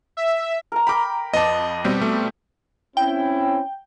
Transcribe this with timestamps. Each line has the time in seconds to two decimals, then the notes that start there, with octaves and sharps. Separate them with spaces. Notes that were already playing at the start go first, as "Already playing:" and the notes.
0.17 E5
0.72 A#4 A#5
0.87 A#4 G5 B5 D6
1.33 F2 B4 D5 D#5 A5
1.84 B2 G3 C4
2.01 A3
2.97 C4 C#4 E4 G5